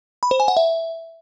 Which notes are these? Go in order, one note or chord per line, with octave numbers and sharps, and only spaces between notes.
B5
C5
G#5
F#5
E5